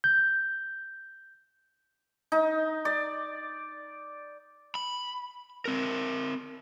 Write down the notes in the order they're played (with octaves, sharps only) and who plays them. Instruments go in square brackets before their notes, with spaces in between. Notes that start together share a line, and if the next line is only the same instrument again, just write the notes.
[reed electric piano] G6
[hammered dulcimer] D#4
D5
[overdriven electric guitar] B5
C4 A#4